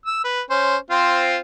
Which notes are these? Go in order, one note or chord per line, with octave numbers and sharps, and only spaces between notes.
E6
B4
C#4 C5
C4 F4 C5